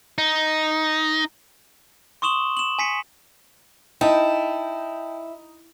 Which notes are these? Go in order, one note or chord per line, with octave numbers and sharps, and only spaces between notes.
D#4
C6 C#6 D#6 E7 F#7 G7
E7 F#7
G#5 B6 C#7
D#4 E4 G5 A5